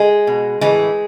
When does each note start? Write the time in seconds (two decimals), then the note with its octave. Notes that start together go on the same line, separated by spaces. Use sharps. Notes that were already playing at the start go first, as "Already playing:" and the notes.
Already playing: G#3
0.27 B2
0.61 A2 E3 G#3